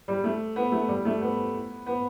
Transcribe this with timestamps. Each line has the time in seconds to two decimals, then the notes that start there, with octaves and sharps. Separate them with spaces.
0.08 G3
0.24 A3
0.56 B3
0.72 A3
0.88 G3
1.05 A3
1.21 B3
1.86 B3